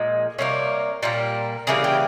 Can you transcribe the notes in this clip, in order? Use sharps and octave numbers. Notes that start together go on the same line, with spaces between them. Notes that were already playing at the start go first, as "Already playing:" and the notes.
Already playing: A#2 F3 G#3
C3 G3 A#3 C#5
A#2 G3 A#3
C#3 E3 G3 A#3 G#4
G4